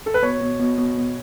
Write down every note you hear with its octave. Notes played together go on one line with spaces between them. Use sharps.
A4
B4
B2 C#5
B2
B2
B2
B2